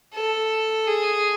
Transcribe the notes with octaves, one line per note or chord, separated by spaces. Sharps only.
A4
G#4